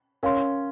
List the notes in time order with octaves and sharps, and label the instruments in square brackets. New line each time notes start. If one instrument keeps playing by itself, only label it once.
[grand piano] C#4 [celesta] A#4 F5 C6